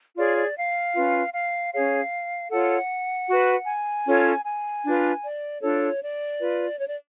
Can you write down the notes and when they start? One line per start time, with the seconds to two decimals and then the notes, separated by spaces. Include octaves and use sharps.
0.16 F4 G#4 C#5 D5
0.36 D5
0.56 F5
0.95 C#4 F4 B4
1.33 F5
1.72 C#4 G#4 C#5 F5
2.50 F4 A4 C#5 F#5
3.28 F#4 B4
3.66 G#5
4.06 C#4 F4 A4 C#5
4.45 G#5
4.84 D4 F4 B4
5.22 D5
5.61 D4 F4 A4 C#5
6.01 D5
6.39 F4 B4
6.78 C#5
6.88 D5